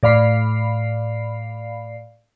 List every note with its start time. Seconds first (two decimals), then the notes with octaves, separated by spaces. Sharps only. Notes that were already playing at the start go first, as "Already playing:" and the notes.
0.03 A2 D5 F5 B5 C7